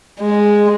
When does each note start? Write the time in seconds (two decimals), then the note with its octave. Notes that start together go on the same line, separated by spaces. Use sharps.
0.21 G#3